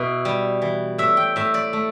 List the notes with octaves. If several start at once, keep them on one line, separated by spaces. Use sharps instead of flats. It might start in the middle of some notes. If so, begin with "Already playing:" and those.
Already playing: B2 E4
G3
E3
A2 E5
G5
A2 E5
D5
A3